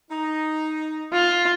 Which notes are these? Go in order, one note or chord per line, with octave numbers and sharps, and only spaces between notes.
D#4
F4